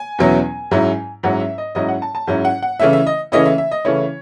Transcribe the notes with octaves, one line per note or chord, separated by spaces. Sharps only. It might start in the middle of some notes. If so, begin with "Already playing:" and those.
Already playing: G#5
E2 B2 F#3 C#4 E4
G#2 F#3 C#4 E4
G#2 F#3 C#4 E4 F#5
E5
D#5
G#2 F#3 C#4 E4 D#5
F#5
A5
A5
G#2 F#3 C#4 E4
F#5
F#5
C#3 E3 A3 C#4 E4 E5
E5
D#5
C#3 E3 A3 C#4 E4 D#5
E5
E5
D#5
C#3 E3 A3 C#4 E4 C#5